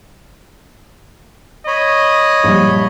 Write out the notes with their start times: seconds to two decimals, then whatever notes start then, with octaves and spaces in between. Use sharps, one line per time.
1.67 C#5 D#5 B5
2.44 A#1 G3